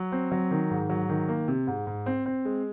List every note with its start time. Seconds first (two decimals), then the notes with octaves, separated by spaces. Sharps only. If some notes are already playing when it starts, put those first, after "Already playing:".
Already playing: F#3
0.12 C4
0.32 F#3
0.51 D#3
0.70 G#2
0.90 F#3
1.09 D#3
1.28 A#3
1.48 C3
1.67 G#2
1.87 G#2
2.06 C4
2.26 C4
2.45 G#3